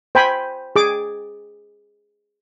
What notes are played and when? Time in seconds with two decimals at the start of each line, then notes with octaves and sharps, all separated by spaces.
0.15 C5 G5 G#5 B5
0.76 G#4 D6